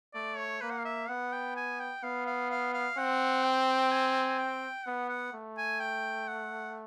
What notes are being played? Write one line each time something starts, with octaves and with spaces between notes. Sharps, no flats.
A3 D5
C#5
A#3 B4
F#5
F5
E5
B3 F#5
G5
G#5
G5
B3 F5
F5
F5
F5
C4 F#5
G5
G#5
G5
B3 F#5
F#5
A3
G#5
G5
F#5